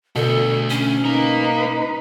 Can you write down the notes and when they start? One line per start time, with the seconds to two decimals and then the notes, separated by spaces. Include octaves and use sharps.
0.16 D2 B2 A4
0.69 C#4
1.05 A#3 D#4 B4 A#5